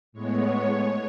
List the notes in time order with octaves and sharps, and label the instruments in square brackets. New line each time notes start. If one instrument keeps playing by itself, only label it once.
[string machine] A2 G#3 B3 C#5